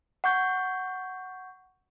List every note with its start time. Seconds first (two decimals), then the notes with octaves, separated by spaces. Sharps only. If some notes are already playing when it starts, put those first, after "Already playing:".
0.24 F#5 C#6 G6